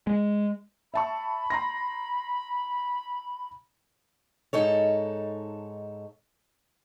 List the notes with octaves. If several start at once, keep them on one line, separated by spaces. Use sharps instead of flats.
G#3
E5 A5 B5 C#6
A#5 C6 A#6
G#2 D#4 A4 C#5